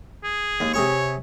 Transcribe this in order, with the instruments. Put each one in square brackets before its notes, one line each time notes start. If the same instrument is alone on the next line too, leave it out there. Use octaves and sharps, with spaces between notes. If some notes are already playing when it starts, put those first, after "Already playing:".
[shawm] G#4
[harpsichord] D#2
[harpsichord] C3 G#4 C#6 [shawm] C#5